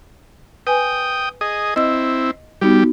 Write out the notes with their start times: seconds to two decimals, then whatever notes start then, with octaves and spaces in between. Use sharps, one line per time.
0.67 B4 G5 G#5 D#6
1.41 G#4 D#5
1.76 C4 E4 D#5 E6
2.61 G3 B3 D#4 F#4 G4